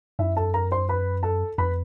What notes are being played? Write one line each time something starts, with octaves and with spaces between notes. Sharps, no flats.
F#2 E4 E5
A4 A5
A#4 A#5
C5 C6
B4 B5
A4 A5
F2 B4 B5